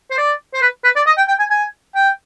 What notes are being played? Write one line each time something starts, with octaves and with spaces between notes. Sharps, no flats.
C5
D5
C5
B4
B4
D5
D#5
G5
G5
G#5
G#5
G5